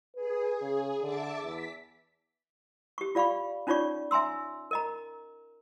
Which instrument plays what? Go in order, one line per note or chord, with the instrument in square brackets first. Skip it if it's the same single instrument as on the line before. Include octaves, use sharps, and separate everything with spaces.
[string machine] G#4 [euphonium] B4
[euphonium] C#3
[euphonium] D3 [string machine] E5 A5 D6
[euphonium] E2 [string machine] B6
[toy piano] G4 C#6
F4 D5 F5 B5 C#6
C#4 D#4 F4 C#5 D5 C#6
E5 G#5 A#5 C6 E6
A#4 D#5 A#5